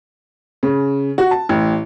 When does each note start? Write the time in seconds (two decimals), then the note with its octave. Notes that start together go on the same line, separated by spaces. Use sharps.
0.63 C#3
1.18 F#4
1.31 A5
1.49 A1